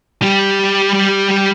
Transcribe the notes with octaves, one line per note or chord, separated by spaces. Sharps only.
G3 G4